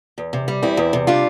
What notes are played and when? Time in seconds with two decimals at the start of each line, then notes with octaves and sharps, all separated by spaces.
0.18 E2
0.33 C3
0.48 G3
0.62 E2 C4 E4
0.77 E2
0.93 C3
1.07 G3 D4 F4